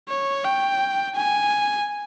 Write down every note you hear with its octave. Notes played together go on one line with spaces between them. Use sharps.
C#5
G5
G#5